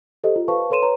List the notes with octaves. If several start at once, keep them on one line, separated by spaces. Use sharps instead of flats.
G4 A4 C5 D#5
F4
B4 C5 F5 A5 C#6
A4 B4 C#5 C6 D#7 E7
B4 C#5 A#5